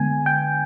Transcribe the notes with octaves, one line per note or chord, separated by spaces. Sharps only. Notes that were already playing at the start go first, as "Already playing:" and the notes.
Already playing: D3 G#3 B3 G#5
G5